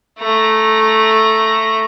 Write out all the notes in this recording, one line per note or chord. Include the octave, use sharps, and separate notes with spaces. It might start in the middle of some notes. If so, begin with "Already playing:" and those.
A3 A#5